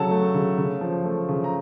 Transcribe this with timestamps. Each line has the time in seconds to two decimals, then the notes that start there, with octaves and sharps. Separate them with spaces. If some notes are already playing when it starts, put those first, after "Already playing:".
Already playing: C#3 F#3 A4 F#5 A5
0.11 A3
0.34 C#3
0.58 C#3
0.81 F3
1.04 A3
1.29 C#3
1.44 A#5